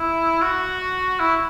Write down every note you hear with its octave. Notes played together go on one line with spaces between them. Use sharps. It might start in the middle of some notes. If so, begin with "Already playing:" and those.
Already playing: E4
F#4
E4